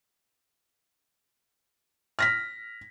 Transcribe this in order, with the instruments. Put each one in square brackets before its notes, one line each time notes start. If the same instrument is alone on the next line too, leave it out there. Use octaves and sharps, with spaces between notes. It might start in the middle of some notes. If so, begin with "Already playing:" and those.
[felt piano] F6 A#6 B6